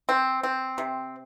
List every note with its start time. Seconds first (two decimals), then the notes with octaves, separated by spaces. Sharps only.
0.09 C4
0.43 C4
0.78 C3